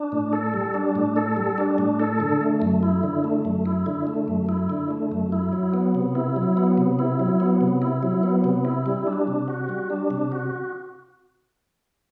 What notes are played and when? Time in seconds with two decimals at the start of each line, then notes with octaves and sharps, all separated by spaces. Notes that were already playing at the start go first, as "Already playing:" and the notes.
Already playing: D4
0.12 A2
0.33 A4
0.54 G3
0.74 D4
0.95 A2
1.16 A4
1.37 G3
1.58 D4
1.78 A2
2.00 A4
2.20 D3
2.41 A3
2.62 F#2
2.83 E4
3.03 D3
3.24 A3
3.45 F#2
3.66 E4
3.86 D3
4.07 A3
4.28 F#2
4.49 E4
4.70 D3
4.91 A3
5.12 F#2
5.32 E4
5.53 F#3
5.74 B3
5.95 C3
6.15 E4
6.36 F#3
6.57 B3
6.78 C3
6.99 E4
7.20 F#3
7.40 B3
7.61 C3
7.82 E4
8.03 F#3
8.23 B3
8.44 C3
8.65 E4
8.86 G3
9.07 D4
9.27 C3
9.48 F#4
9.69 G3
9.90 D4
10.11 C3
10.32 F#4